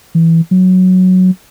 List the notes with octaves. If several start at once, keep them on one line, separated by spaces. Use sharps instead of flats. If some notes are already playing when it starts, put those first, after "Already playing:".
E3
F#3